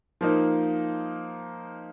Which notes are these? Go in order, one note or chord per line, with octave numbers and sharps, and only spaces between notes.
F3 A#3 D#4